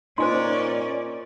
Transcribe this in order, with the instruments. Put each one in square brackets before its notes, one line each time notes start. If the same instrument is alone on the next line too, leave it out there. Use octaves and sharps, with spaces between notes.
[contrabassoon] A#2 [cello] C#4 D5 [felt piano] D#4 [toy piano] C5 G#5 C6